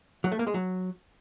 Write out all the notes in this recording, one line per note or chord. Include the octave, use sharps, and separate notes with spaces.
F#3
A3
A#3
G#3
F#3